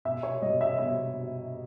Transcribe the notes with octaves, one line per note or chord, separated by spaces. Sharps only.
B2 E5
C#5
G3 D#5
E5
B2 E5